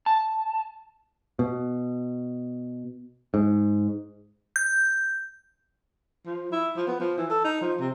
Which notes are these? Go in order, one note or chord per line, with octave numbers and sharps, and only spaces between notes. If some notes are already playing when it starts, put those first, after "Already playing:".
A5
B2
G#2
G6
F3
E4
F3
B3
F3
E3
A4
D#4
F3
C3